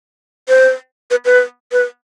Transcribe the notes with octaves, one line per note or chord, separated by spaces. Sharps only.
C5
B4
B4
B4